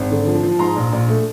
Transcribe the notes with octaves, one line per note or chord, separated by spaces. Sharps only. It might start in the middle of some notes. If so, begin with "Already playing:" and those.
Already playing: G#1
D3
F3
F3
G#2 A#5 C6
A#1
A#1
A3